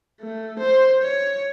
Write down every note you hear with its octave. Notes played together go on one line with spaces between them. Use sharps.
A3
C5
C#5